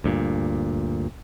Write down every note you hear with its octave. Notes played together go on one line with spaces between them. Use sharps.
D2 G2 A#2